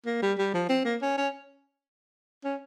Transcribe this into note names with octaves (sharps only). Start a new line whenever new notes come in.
A#3
G3
G3
F3
C4
A#3
C#4
C#4
C#4